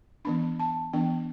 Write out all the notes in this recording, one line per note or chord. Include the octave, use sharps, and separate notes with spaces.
E3 B3 D4 B5
A5
E3 B3 D4 G5